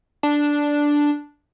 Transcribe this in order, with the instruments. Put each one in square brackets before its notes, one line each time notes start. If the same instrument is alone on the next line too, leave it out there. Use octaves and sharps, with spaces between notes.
[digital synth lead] D4